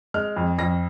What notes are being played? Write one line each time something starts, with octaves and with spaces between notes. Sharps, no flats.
G#3 F6
F2
F2 A#6